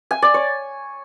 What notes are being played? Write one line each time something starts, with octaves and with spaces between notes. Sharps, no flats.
G#5
D5
C#5